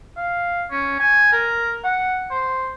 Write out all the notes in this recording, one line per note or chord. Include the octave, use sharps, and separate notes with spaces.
F5
C#4
G#5
A#4
F#5
C5